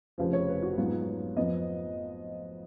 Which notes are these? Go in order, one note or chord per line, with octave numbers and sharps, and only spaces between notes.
F1 F2 C#3 F3 B4
C#5
B4
F#4
G#2 F#3 B3 F4
F2 F3 B3 D#5